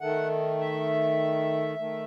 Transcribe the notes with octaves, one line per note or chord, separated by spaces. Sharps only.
D#3 A3 F#5
E5
D#3 A3